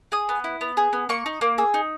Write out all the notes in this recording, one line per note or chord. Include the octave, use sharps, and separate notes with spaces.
G#4 D#6
B3
E4
B3
G#4
B3
A#3 C#6
D#4
A#3
G#4 E6
D#4